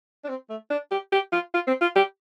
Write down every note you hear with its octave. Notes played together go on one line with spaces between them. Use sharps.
D4
C4
A3
D4
G4
G4
F4
F4
C4
F4
G4